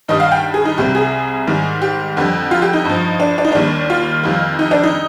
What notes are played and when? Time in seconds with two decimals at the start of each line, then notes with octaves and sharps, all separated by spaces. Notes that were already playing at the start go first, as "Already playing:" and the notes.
0.08 G2 D#3 G3 D#5
0.20 F5
0.32 G5
0.54 G#4
0.65 D#4
0.78 C2 C3 G3 G4
0.95 G#4
1.47 G#2 D#3 G3
1.82 G4
2.17 F2 D3 G3
2.51 F4
2.62 G4
2.73 D#4
2.85 G2 F3
3.20 D4
3.38 D4
3.45 D#4
3.52 D#2 D#3 G3 D4
3.90 F4
4.23 F2 D#3 G3
4.59 D#4
4.71 D4
4.83 D#4